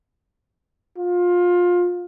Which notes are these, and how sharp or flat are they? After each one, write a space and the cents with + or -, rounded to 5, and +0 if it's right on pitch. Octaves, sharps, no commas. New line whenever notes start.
F4 +20